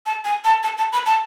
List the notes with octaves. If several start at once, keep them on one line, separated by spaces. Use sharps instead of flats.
A5
G#5
A5
A5
A5
B5
A5